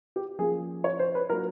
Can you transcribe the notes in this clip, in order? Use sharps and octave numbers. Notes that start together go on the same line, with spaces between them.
G4
F3 A#3 C#4 F4 G#4
C#5
C5
B4
F#3 A#3 D4 F4 A#4